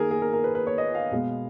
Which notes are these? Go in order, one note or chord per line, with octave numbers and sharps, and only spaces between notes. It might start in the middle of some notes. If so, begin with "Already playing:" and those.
Already playing: D#3 A#3 G#4 A#4
G#4
A#4
A#4
B4
B4
C#5
D#5
F5
B2 G#3 B3